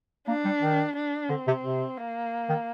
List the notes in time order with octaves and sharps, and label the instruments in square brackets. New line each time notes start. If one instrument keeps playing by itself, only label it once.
[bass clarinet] A#3 [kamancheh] D4
[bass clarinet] G3
D#3
[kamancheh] D4
[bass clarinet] D3 [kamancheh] C4
[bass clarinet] C3
C3
[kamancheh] A#3
[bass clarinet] D#3